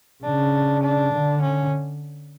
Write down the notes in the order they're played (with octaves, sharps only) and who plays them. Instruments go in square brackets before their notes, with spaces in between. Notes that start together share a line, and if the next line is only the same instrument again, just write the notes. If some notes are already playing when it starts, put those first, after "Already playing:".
[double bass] C#3 [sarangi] D4
[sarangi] D4
[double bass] D3
[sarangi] C#4